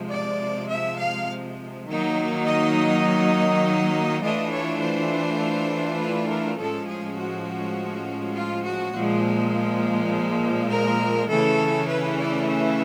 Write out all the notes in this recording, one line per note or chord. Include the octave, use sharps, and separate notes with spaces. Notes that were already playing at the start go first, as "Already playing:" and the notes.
Already playing: C3 F3 G#3
D5
E5
F5
D#3 F#3 A#3 D#4
D#5
E3 A3 D4 F4 D#5
C#5
C5
B4
A#4
A2 F3 G#3 C#4 A4
G#4
F#4
F4
F#4
A#2 F3 G#3
A#4
C#3 E3 A3 C#4 A4
B4
D5
E5